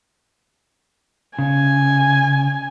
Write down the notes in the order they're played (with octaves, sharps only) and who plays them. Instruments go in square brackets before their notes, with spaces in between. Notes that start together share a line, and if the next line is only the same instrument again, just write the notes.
[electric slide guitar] C#3 [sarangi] G#5